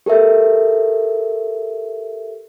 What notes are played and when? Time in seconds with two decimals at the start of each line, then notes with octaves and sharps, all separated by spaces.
0.06 G4 A4 A#4 E5